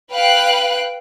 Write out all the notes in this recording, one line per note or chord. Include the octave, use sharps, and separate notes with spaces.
B4 F5 G5 F#6